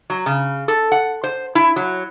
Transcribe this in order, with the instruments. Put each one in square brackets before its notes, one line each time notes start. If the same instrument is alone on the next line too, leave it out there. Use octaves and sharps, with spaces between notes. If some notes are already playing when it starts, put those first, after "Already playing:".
[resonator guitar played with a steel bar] F#3
C#3
A4
F#5
C5
E4
F#3